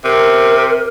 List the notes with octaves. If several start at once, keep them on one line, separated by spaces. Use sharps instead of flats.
C3 A#4